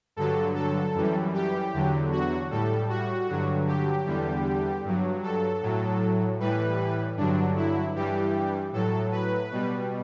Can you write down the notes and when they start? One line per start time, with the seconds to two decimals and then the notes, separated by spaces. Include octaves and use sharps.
0.16 G2 D3 F#3 A4
0.55 A4
0.94 F#2 E3 G3
1.34 G4
1.73 E2 D3 F#3
2.12 F#4
2.50 A2 G3 A4
2.90 F#4
3.29 G2 D3 F#3
3.68 G4
4.06 E2 D3 G3
4.84 G2 F#3
5.23 A4
5.62 A2 F#3
6.40 A2 E3 G3 B4
7.17 G2 D3 F#3 D4
7.57 E4
7.95 G2 E3 G3 G4
8.72 A2 F#3 A4
9.12 B4
9.51 B2 G3